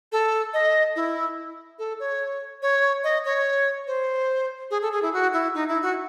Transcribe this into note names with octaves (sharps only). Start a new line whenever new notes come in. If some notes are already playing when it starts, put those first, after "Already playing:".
A4
D#5
E4
A4
C#5
C#5
D#5
C#5
C5
G#4
A4
G#4
E4
F#4
E4
D#4
E4
F#4